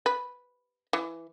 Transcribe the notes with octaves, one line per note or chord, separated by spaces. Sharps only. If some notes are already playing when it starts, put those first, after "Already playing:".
B4
E3